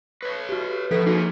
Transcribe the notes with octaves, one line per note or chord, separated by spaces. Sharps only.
B4 C#5
F#4 G4
B2 F3 B3 F#4 A4 B6
A#3 D#4 F#4 G#4